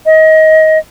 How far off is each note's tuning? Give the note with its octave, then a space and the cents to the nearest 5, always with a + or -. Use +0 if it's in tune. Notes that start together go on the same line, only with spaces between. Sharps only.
D#5 +25